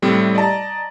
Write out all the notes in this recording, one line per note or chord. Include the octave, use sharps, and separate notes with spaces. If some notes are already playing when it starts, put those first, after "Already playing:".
A2 C3 G3 C4
D5 D#5 A5 A#5